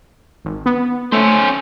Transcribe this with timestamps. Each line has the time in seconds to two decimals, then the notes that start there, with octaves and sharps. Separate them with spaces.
0.45 G#1
0.66 B3
1.12 A3 C#4 C5